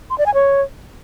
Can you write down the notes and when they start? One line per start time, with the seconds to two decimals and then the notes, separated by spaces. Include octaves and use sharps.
0.10 C6
0.18 D5
0.26 G#5
0.34 C#5